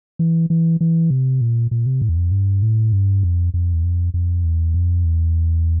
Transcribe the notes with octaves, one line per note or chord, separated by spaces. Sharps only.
E3
E3
E3
C3
A#2
A#2
C3
A2
E2
F2
G2
A2
G2
F2
F2
E2
F2
F2
E2
F2
E2